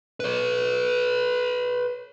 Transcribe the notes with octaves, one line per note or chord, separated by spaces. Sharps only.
B4 C#5